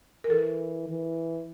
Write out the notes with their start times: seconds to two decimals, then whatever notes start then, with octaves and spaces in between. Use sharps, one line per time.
0.24 A#4
0.30 E3 A4
0.89 E3